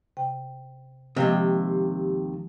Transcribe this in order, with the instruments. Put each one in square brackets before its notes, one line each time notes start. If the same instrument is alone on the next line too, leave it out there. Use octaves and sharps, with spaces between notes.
[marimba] C3 G5
[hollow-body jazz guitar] D#2 C3 [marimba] F3 G#3 F5